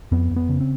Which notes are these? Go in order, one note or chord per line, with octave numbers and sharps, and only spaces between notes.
F2 B3
F2
B3
C#3
C4